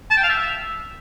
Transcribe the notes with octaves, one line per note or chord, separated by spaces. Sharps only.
A5
G5
F5
E5